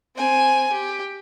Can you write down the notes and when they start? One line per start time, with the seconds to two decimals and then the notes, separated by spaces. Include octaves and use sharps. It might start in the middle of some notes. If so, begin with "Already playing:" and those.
0.16 C4 G#5
0.72 G4